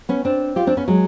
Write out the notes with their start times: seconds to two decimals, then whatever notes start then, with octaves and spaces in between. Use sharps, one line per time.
0.09 B3 C#4
0.25 C4 D4
0.56 F4 G4
0.67 C4 D4
0.77 B3 C#4
0.88 F#3 G#3